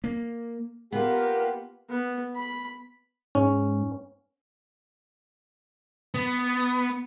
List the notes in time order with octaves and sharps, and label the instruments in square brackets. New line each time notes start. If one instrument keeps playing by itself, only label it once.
[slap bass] A#3
[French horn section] A#3 G4 [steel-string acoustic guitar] B3 F4 [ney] A#4
[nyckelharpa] B3
B5
[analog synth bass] G#2 [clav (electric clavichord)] C#4
[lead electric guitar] B3